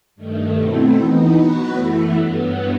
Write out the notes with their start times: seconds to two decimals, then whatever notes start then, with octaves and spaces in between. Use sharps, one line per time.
0.16 G2 D#3 A3
0.56 B2 F#3 A3 C4 E4
0.95 E3 B3 D#4
1.34 F#3 B3 F#4 B4
1.73 F#2 E3 A3 E4
2.13 G2 F#3 B3